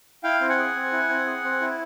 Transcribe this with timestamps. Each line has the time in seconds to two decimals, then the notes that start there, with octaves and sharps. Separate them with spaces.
0.23 E4 F5 G5
0.41 C4
0.49 F#5 G#5
0.59 G#4
0.75 C4
0.92 E4
1.10 C4
1.27 G#4
1.44 C4
1.61 E4